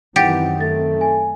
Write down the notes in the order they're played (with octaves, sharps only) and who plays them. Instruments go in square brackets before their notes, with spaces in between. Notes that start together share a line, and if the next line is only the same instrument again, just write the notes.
[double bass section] F#2 D#3 C4 [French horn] E3 [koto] G4 [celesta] F#5 A6
[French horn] A3 [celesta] A6
[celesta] G#5